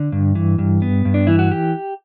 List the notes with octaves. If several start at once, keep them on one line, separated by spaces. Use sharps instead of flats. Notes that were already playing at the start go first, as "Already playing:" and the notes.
Already playing: D3
G2
E3
G2
B3
G2
D4
E3 E4
F#4
G4